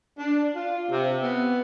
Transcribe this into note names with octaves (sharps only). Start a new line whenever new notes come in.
D4
F4
C3
B3